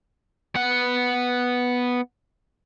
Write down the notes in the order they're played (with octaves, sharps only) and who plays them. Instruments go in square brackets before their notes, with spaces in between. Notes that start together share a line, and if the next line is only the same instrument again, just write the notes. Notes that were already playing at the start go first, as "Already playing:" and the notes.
[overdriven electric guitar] B3 F#5